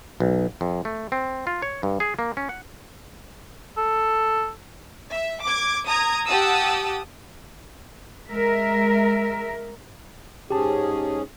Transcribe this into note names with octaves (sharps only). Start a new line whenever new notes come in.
B1
F2
A3
C4
F4
C#5
G2
G#4
A#3
C#4
F#5
A4
E5
D6 G#6
A#5 D#6 G#6
G4 F#5 A5 D#6 E6
G#3 A#4 E5
G#2 C#4 G4 G#4 A5